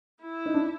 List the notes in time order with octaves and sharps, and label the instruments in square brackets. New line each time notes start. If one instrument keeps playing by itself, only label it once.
[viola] E4
[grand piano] D#4
D4